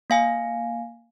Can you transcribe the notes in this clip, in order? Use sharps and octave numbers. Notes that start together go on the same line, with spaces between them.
A#3 F5 G#5